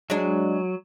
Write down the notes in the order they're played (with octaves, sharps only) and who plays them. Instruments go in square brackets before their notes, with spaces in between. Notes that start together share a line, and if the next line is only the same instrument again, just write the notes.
[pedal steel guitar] F#3 [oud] G#3 D4